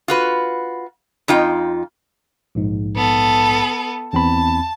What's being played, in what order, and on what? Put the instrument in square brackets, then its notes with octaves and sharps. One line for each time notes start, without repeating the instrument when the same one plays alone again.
[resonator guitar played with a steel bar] F4 F#4 B4
F2 D#4 F4 G5
[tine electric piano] A#1 G#2
[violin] B3 A4
[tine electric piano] E2 C4 B5 [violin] A5